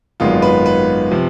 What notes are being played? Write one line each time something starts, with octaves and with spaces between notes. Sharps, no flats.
G#1 F#2 D#3 G#3 B3 F4
B4
B4
C3 F3